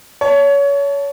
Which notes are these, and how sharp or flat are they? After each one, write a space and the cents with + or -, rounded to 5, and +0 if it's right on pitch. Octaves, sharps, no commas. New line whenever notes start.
C#5 +25 A5 +0